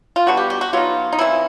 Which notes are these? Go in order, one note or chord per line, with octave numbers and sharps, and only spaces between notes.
F4
B2 G3 B3 D4 F#4
G4
G4
F#4
F#3 B3 D#4 F4
D#4
C#3 E3 G3 C4 E4